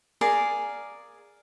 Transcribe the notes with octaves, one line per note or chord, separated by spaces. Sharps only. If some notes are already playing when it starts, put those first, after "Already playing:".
G#4 A#4 D5 F5